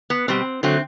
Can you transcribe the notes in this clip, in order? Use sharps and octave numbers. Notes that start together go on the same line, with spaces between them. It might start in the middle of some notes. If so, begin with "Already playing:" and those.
B3
B2 G3 C4
D3 F#3 A3 C4